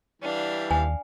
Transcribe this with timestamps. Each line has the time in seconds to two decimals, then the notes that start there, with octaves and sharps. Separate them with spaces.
0.22 E3 G3 D4 F5
0.71 D#2 G#5